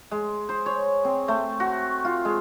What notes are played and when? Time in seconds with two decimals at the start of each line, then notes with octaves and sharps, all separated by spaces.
0.11 G#3
0.49 C5
0.66 C#5
1.05 C4
1.28 A3
1.60 F#4
2.05 F4
2.25 G#3